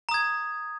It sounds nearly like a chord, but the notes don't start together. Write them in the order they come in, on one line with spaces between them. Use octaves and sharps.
A#5 D#6 G#6